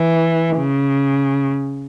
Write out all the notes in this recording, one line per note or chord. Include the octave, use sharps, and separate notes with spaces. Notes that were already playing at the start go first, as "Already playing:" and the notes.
Already playing: E3
C#3